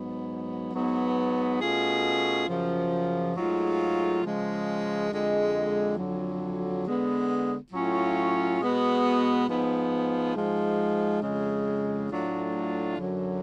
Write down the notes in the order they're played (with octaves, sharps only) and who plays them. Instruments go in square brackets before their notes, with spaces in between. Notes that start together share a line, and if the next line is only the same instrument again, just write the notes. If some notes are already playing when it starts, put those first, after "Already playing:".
Already playing: [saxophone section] G#2 F#3 B3
G#2 F#3 B3
B2 A3 C#4 F4 G#4
F#2 C#3 F3
G#2 F#3 A3 F4 G#4
C#3 F3 G#3
F2 D3 G#3
F2 D3 F#3
D3 G#3 B3
A2 F#3 C#4 F4
B2 G#3 B3 F#4
G#2 F3 B3
G#2 F3 G#3
F2 C#3 G#3
A2 F#3 A3 D4 F4
F#2 D3 F#3